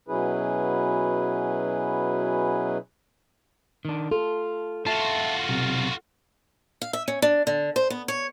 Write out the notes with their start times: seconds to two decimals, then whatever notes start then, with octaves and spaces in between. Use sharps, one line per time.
0.08 B2 F#3 C#4 E4 G#4 B4
3.85 D#3 D4
4.11 F4 A4
4.87 F4 F#4 E5 A5
5.49 B1 C3
6.82 F5
6.93 E5
7.08 C#4
7.22 D4
7.47 D3
7.76 C5
7.90 B3
8.08 C#5